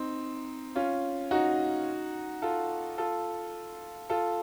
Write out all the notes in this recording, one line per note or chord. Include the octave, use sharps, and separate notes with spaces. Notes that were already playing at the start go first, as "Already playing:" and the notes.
Already playing: C4 D#4
C#4 F4
D#4 F#4
F4 A4
F4 A4
F4 A4